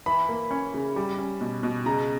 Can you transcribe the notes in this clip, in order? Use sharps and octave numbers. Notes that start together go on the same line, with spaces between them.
E3 B5
A#3
C#4
C#3
G3
C#4
B2
B2
C#3 A#5